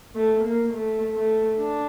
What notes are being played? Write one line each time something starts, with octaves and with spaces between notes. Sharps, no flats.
A3
A#3
A3
A3
D4